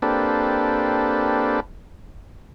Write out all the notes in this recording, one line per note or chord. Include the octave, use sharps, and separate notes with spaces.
A#3 C4 D4 G4 A4 B4